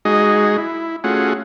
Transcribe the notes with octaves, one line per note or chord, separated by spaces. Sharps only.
G#3 D#4 F#4 G#4 D#5
E4
A3 C#4 F4 F#4 G#4 F#5